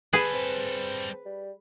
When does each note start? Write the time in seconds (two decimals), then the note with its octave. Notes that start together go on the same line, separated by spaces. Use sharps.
0.13 G3 G#4 A4 B4
0.34 C4
1.25 G3